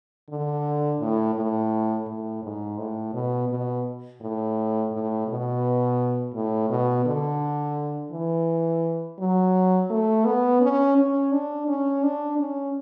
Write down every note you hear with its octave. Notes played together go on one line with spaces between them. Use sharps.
D3
A2
A2
A2
G#2
A2
B2
B2
A2
A2
B2
A2
B2
D3
E3
F#3
A3
B3
C#4
C#4
D4
C#4
D4
C#4